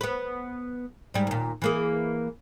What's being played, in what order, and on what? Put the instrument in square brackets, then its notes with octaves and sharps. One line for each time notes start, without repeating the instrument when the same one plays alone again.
[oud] B3 B4
G#2 G3
D#2 A#2
E3 A#3 G#4